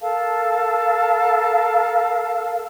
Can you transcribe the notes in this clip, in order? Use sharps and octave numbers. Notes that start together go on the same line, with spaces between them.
A4 A#4 F5 A5